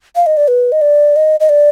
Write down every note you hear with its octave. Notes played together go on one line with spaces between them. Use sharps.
F5
D#5
D5
B4
D#5
D5
D#5
D#5
D5